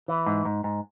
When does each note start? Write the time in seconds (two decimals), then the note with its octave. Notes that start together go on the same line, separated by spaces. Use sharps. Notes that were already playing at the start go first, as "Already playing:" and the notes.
0.08 E3
0.26 G#2
0.45 G#2
0.64 G#2